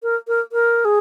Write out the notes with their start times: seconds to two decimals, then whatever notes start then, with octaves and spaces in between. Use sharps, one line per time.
0.02 A#4
0.27 A#4
0.52 A#4
0.84 G#4